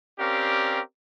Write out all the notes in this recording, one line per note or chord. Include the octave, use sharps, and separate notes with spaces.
C4 C#4 G4 A#4 D5 F5